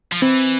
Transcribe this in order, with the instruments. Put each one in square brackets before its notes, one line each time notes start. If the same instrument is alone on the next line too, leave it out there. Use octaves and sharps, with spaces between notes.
[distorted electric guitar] F3
[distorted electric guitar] E3 [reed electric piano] C4